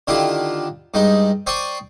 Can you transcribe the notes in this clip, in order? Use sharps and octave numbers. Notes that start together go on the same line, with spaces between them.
D3 D#3 D4 E4 F4 G4
G2 G#3 D#4 G5
C5 D5 G5 C6 C#6 D#6